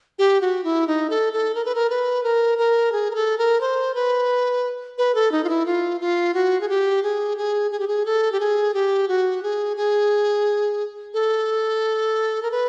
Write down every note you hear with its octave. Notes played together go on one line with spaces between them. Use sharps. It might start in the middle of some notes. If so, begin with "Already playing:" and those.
G4
F#4
E4
D#4
A4
A4
A#4
B4
A#4
B4
A#4
A#4
G#4
A#4
A4
A#4
C5
B4
B4
A4
D#4
F4
E4
F4
F4
F#4
G#4
G4
G#4
G#4
G#4
G4
G#4
A4
G4
G#4
G4
F#4
G#4
G#4
A4
A#4
B4